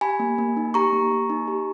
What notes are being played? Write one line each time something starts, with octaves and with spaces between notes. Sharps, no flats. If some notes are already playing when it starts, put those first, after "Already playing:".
G4 G#5 B5
A#3
A#3
D#4
G4 A#5 C#6
A#3
A#3
D#4
G4